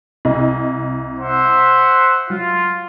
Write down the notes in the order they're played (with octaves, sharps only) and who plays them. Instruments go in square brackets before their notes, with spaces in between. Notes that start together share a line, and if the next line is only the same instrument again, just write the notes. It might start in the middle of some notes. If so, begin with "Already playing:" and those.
[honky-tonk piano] C2 D#5
[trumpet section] C5 E5 F#5
[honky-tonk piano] F#3 [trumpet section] F4